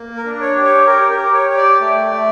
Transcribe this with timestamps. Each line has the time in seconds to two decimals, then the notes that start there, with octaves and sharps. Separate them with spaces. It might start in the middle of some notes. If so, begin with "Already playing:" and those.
Already playing: A#3
0.17 A#4
0.25 D4
0.41 C#5
0.55 G4
0.64 C#5
0.87 G4 A#4
1.10 A#4
1.18 G4
1.34 C#5
1.49 G4
1.57 D5
1.81 A3
2.11 A3